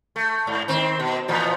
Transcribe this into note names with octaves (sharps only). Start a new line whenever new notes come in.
A3
G#2
D#3 C4
B2
A2 E3 F3